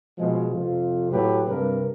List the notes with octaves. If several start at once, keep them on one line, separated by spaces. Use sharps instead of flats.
B2 F3 G#3
F2 C3 F4
A2 F#3 G4 B4
G2 C3 A#4 B4